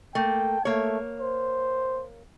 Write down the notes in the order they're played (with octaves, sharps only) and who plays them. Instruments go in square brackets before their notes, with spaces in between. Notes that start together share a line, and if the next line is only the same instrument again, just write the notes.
[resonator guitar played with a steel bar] A3 A#3 [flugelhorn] G5
[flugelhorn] A3 [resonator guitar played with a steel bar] A#3 C#5
[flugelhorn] C5